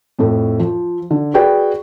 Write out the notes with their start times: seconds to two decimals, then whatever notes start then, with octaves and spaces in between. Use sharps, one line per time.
0.19 F2 A2 A3
0.59 F3
1.11 D3
1.34 F#4 G#4 B4 D5 G5